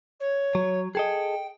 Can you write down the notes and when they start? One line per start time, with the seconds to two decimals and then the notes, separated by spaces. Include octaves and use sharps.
0.20 C#5
0.55 F#3
0.95 G#4 A4 D#5 G5